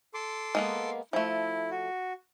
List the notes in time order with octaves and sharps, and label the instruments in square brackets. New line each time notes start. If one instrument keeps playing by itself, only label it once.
[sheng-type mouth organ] A4 C6 D6
[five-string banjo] G#3 A#3 B3
[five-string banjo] F3 A3 [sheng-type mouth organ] E4
[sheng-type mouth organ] F#4